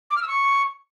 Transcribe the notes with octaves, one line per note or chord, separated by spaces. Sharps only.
D6
F6
E6
C#6